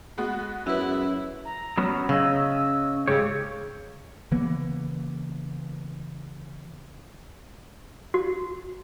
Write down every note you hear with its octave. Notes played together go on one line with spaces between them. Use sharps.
G#3 B3 F#4
F#2 E4 B4 E6
A#5
F#3 B3 C#4
C#3 C#4 D#5 E6
G#2 C#3 G4 C#5
C#3 E3 A#3 B3
F#4